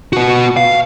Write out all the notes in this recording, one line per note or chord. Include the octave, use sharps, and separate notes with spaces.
B3 F#4
F5